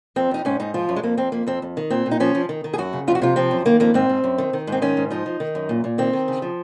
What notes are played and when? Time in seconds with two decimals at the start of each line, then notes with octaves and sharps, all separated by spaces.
0.16 F2 C4
0.31 F2 D#4
0.45 G#2 C#4
0.60 G#2 D#4
0.74 F3 F4
0.89 F#2
0.96 G#3
1.03 F2 A#3
1.17 F2 C4
1.32 F2 A#3
1.47 F2 C4
1.62 F2
1.77 D#3
1.90 A#2 C4
2.06 A#2
2.11 D#4
2.20 F3 C#4
2.35 F3
2.49 D#3
2.64 D#3
2.74 G#4
2.78 F#2 F#4
2.93 C#3
3.08 F2 F4
3.15 F#4
3.22 C3 F4
3.36 F3 C4
3.51 F#2
3.66 D#3 A#3
3.80 F2 A#3
3.94 G#2 C4
4.09 G#2
4.24 F#2
4.38 D#3
4.53 D#3
4.67 G#2 C4
4.82 D#3 C#4
4.97 G#2
5.10 F3 D#4
5.26 F3
5.40 D#3
5.55 F#2
5.69 A#2
5.84 A#2
5.98 D#3 C4
6.13 D#3
6.28 C#3
6.42 F3